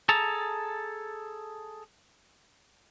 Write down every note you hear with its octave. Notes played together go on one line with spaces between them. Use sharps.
G#4 A4 A5 A#5